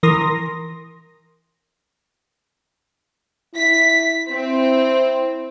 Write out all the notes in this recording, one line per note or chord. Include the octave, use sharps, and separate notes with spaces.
E3 A#4 C6 D#6 A#6
E4 B6
C4 E4